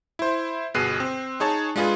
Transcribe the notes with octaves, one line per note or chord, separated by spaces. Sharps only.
E4 C5
G1 B2 G#4 F#6 C7 D#7
C4
D#4 G#4 C#5 A5
G#3 D4 F4 G#4 B4